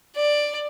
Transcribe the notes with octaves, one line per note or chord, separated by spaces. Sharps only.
D5